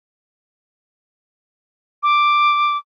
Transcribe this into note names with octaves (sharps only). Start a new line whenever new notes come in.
D6